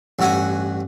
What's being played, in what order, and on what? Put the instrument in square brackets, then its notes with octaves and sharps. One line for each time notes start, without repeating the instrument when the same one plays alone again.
[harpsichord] A1 G2 F#4 E5 F#5 G#5